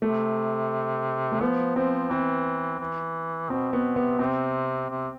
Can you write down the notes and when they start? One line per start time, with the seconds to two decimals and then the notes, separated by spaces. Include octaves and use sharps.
0.01 C3 A3
1.32 A3
1.41 F3 B3
1.76 F3 C4
2.10 E3 C4
2.80 E3
3.50 B2 C4
3.73 B2 B3
3.96 C3 B3
4.19 C3 C4
4.89 C3